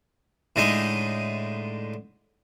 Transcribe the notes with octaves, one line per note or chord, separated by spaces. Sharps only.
A2 D3 G#3 D#4 D#6